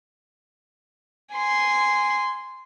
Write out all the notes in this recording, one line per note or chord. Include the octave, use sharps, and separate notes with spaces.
G#5 C6